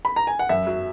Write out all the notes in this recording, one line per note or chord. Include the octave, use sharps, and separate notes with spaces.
B5
A#5
G#5
F#5
F#2 E5
F#3